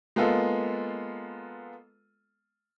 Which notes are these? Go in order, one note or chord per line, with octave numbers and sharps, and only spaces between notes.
G#3 A#3 B3 F4 A4